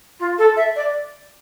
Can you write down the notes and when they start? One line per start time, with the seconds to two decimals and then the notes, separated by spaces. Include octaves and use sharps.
0.19 F4
0.38 A4
0.56 E5
0.75 D5